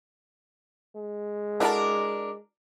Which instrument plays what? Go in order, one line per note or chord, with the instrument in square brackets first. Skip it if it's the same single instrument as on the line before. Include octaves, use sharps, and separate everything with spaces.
[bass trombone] G#3
[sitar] D4 A#4 [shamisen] E4 F#4 A4